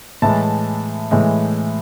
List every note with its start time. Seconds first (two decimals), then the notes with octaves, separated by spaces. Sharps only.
0.22 A2 E3 G#3 A5
1.11 A2 E3 G#3